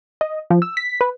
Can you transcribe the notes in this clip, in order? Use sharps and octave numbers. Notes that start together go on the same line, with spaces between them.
D#5
F3
E6
B6
B4